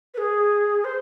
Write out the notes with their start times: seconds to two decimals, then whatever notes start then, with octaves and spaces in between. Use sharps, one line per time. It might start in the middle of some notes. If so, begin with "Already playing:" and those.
0.14 B4
0.18 G#4
0.84 C5